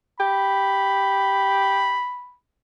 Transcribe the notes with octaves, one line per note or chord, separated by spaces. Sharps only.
G4 B5